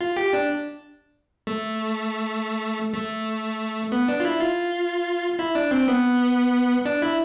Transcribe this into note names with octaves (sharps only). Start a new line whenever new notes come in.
F4
G4
D4
A3
A3
B3
D4
F4
E4
F4
E4
D4
C4
B3
D4
E4